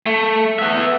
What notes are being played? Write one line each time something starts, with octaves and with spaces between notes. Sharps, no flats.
A3
B3 E5